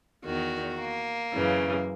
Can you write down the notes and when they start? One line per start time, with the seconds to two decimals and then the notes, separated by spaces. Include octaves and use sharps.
0.24 E2 D#3 F#4
0.79 A#3
1.34 F#2 C#3 E3